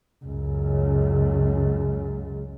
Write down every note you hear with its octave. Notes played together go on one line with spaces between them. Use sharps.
C#2 F#2